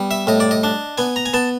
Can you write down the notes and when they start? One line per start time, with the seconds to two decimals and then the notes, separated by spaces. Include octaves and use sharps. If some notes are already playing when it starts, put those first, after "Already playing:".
Already playing: G3 B3
0.11 E5
0.27 A2 D#5
0.40 D5
0.51 D#5
0.64 D4
0.98 B3 G#5
1.16 A#5
1.26 G#5
1.34 B3 A5